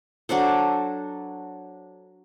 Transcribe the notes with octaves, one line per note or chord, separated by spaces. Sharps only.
F#3 D4 A4 C5